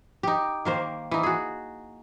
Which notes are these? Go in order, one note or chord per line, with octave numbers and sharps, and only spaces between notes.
D#4 G4
D#3 A#3 C5
E3 D#4
F#4 G#4